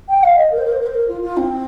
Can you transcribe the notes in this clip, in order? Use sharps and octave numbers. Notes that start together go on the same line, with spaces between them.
G5
F5
D#5
A#4
C5
A#4
C5
A#4
C5
A#4
F4
F4
C4